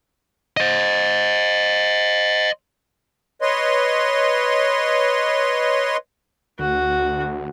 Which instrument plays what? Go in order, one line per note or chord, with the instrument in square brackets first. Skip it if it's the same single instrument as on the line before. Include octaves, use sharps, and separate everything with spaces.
[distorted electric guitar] C5 D#5
[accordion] B4 C#5 D#5 C6
[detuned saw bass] D2 [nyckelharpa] F#4